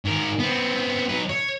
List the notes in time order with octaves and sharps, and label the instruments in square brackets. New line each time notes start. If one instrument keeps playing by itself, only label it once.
[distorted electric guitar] G#2 A#4
B3 C4
F#3 B4
C#5